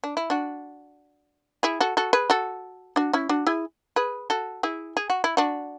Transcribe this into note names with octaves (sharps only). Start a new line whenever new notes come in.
D4
E4
D4 F#4
E4 G#4
F#4 A4
F#4 A4
G#4 B4
F#4 A4
D4 F#4
C#4 E4
D4 F#4
E4 G#4
G#4 B4
F#4 A4
E4 G#4
G#4
F#4
E4
D4 F#4